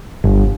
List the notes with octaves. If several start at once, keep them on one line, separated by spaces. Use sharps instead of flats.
G1